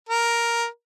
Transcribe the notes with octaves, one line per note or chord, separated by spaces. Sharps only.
A#4